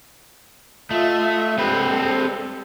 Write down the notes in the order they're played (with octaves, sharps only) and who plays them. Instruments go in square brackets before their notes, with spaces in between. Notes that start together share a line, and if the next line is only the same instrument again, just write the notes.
[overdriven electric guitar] A3 [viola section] F4 D#5 E5
[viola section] G3 G#3 A4 [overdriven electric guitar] C4 B4